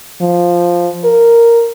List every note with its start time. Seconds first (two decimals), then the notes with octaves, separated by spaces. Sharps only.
0.21 F3
1.05 A#4